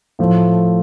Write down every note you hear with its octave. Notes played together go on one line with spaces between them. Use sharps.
A2 F3 A3